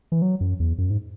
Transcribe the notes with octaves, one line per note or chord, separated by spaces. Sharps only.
E3
F#3
F#2
E2
F#2
G#2